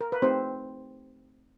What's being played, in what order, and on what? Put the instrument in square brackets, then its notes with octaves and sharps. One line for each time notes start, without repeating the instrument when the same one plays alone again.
[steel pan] A#4
B4
A3 C4 D#4 G4 C5